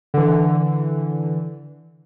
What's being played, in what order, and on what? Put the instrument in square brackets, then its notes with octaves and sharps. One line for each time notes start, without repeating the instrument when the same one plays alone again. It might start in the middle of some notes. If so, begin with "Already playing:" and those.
[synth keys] D3 E3